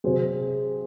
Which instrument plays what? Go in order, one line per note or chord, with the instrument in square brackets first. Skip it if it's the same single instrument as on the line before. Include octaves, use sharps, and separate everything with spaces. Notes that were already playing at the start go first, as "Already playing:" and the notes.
[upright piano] C3 F#3 G#4 C5